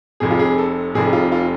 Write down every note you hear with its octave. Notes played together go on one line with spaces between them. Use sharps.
F1 F2 C3 G#4
F4
G#4
A4
F1 F2 C3 G#4
F4
F4